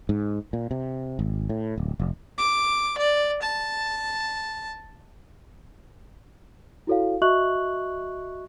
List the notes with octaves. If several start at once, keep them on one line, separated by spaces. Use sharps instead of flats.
G#2
A#2
C3
G#1
A2
D1
F1
D6
D5
A5
E4 F#4 A4 C#5 F5
F#4 D#5 E5 C#6 F#6 F#7